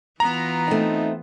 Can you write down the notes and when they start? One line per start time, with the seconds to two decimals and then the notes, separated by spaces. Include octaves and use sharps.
0.20 E3 B3 F4 A#5
0.68 A3 C4 D#4